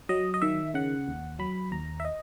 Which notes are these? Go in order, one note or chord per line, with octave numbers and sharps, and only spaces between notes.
F#3 D#5
D#5
D#3 E5
C#3 F#5
D#2
F#3 B5
D#2 A#5
E5
D#5